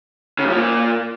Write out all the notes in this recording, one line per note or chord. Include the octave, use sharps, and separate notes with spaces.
C#3
G2
F3
A#2